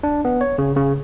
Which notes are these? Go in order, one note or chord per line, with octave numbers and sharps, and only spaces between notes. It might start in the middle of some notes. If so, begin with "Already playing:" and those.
D4
B3
C#5
C#3
C#3